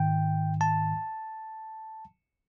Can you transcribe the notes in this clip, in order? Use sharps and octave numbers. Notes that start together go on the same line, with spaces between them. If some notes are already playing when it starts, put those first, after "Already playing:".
Already playing: G#2 D#3 G5
A5